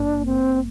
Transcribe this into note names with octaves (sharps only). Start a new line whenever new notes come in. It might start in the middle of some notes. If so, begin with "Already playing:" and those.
Already playing: G#1 G2 A#3 D4
C4